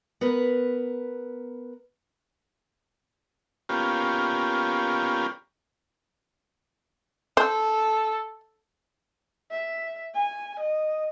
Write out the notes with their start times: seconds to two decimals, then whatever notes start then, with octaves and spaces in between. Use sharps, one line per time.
0.21 B3 A#4 B4
3.69 A#3 B3 C#4 F4 G4
7.37 A4 C5
9.51 E5
10.15 G#5
10.60 D#5